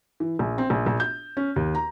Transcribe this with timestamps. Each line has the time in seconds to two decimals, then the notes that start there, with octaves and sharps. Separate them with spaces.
0.20 E3
0.39 A#1
0.58 C4
0.70 A#1
0.86 A#1
1.00 G6
1.37 C#4
1.56 D#2
1.75 A#5